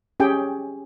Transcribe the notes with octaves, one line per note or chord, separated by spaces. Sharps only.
C#4 G4 G#4 G5